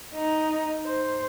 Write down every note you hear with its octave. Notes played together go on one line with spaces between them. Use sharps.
D#4
C5